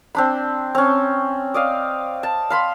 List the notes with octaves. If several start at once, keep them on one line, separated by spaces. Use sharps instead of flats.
C4 D4 B5
C4 C#4
D5 D#5 F5
A5
F5 B5 C6